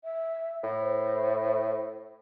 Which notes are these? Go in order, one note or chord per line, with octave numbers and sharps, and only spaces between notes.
E5
A2
C5